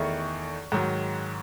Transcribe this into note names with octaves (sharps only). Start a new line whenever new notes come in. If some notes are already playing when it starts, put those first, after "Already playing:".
Already playing: E2 D#3 A3 E4 C#6
G#2 D#3 F#3